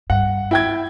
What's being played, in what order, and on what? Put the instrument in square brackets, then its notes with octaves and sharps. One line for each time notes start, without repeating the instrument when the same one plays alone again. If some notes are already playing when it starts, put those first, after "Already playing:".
[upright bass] G2 [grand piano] F#5
[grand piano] E4 G5 G#6